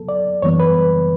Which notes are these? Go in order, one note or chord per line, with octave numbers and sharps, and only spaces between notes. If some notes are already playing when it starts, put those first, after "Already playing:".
Already playing: B2 F#3 B3 A4
D5
F#2 E3 G3 B3 C#5
B4